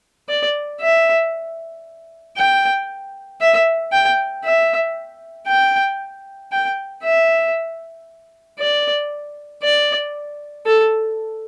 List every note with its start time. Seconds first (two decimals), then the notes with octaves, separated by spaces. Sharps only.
0.29 D5
0.81 E5
2.37 G5
3.41 E5
3.92 G5
4.44 E5
5.48 G5
6.52 G5
7.03 E5
8.59 D5
9.63 D5
10.66 A4